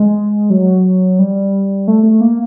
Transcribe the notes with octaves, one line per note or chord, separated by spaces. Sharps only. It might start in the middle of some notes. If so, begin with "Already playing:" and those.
Already playing: G#3
F#3
G3
A3
A3
A#3